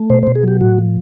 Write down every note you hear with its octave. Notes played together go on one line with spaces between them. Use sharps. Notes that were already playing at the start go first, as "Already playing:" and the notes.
Already playing: A3
B2 C5
C5
B2
G#4
F#3 G4
A2 F#4
F3